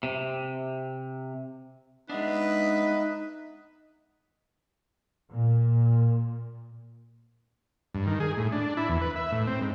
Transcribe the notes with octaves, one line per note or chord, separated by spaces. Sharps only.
C3
G#3 B3 D4 D#4 B4 D#5 E5
A#2
G2
D#3
G#4
A2
D4
E4
E2
B4
E5
A2
C4
G#2